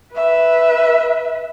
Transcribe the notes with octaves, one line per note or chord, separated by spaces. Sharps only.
B4 E5